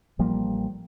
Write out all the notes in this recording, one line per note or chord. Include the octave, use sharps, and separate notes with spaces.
A1 F3 G3 A#3